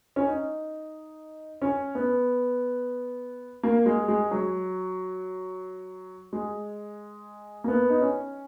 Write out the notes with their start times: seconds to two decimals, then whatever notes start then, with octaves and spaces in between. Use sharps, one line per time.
0.16 C#4
0.27 D#4
1.62 C#4
1.95 B3
3.63 A#3
3.86 G#3
4.08 G#3
4.31 F#3
6.33 G#3
7.64 A#3
7.68 B3
7.90 D#4
8.01 C#4